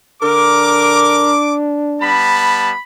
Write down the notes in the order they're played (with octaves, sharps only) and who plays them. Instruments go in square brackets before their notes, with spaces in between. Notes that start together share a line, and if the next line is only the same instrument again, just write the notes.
[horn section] D3 A#4 [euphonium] D4 [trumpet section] D6
[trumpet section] G3 B3 A5 [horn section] B5